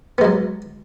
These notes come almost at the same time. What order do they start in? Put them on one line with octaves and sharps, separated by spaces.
B3 G#3 F#3